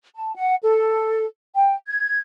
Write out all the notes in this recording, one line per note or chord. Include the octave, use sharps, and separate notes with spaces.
A5
F#5
A4
G5
G#6